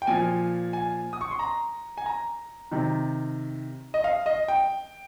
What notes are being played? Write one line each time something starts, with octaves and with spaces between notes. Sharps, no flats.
G5
A#2 F3 G#5
G#5
D#6
C#6
C6
A#5
G#5
A#5
C3 D#3
D#5
F5
D#5
G5